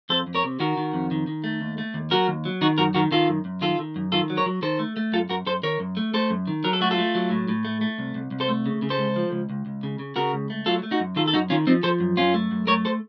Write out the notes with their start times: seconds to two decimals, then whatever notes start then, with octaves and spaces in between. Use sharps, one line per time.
0.09 F2 A4 C5
0.27 F2
0.35 A#4 C#5
0.44 C3
0.60 D#3 F#4 A#4
0.77 D#3
0.94 F2
1.11 D#3
1.27 D#3
1.44 A3
1.61 D#2
1.78 A3
1.94 D#2
2.11 F#3 F#4 A#4
2.28 D#2
2.45 F#3
2.61 D#3 D#4 F#4
2.78 F#2 F#4 A#4
2.94 D#3 F#4 A#4
3.11 D#3 F4 A4
3.29 F#2
3.45 F#2
3.61 D#3 F4 A4
3.79 D#3
3.96 F#2
4.12 D#3 F4 A4
4.30 F#3
4.37 A#4 C#5
4.46 F#3
4.62 D#3 A4 C5
4.79 A3
4.97 A3
5.12 F#2 F4 A4
5.29 F#2 F#4 A#4
5.46 F#2 A4 C5
5.63 D#3 A#4 C#5
5.80 F#2
5.97 A3
6.14 A3 A4 C5
6.30 F#2
6.47 D#3
6.64 F#3 A#4
6.73 A4
6.81 A3 F#4
6.91 F4 A4
6.98 A3
7.15 F#3
7.31 A2
7.48 A2
7.65 A3
7.81 A3
7.98 C2
8.15 C2
8.31 C2
8.40 A4 C5
8.48 A3
8.66 C#3
8.82 C#3
8.90 A4 C5
8.98 C#2
9.16 F3
9.32 C#2
9.50 C#2
9.66 C#2
9.83 C#3
9.99 C#3
10.16 C#3 F#4 A#4
10.33 C#2
10.50 A3
10.66 F#3 F4 A4
10.83 A3
10.91 D#4 F#4
11.00 F#2
11.16 D#3 F4 A4
11.28 A4
11.34 F#2 D#4 F#4
11.50 D#3 C#4 F4
11.67 F3 C4 D#4
11.83 F3 A4 C5
12.00 F#2
12.17 F#2 C#4 F4
12.34 A3
12.51 F#2
12.67 A3 A#4 C#5
12.85 A4 C5